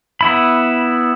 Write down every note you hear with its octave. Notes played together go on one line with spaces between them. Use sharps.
B3 E4 B5